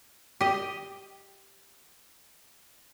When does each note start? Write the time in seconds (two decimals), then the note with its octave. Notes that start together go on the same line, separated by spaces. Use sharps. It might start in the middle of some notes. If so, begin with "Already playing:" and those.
0.41 G4 D#5